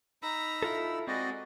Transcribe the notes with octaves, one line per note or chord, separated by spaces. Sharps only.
D#4 A#5 B5 E6
E4 F4 A4
G#3 C4 F#4 D5 D#5